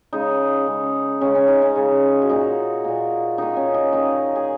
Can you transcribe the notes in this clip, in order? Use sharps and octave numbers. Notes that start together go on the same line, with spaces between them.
C#3 G#3 D#4
C#3 G#3
C#3 G#3 C#4
C#4
D#4
C#4
C#3 G#3
F#4
A#2 A#3 D#4
A#2 A#3
D#3 A#3 D#4
C#4
D#4
D#3 A#3 D#4
G#4